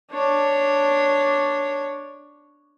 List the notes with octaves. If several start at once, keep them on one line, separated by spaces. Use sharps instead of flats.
D4 C#5